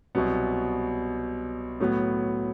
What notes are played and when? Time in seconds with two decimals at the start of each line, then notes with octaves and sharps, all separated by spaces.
0.15 C2 B2 F#3 B3
1.80 A2 F#3 B3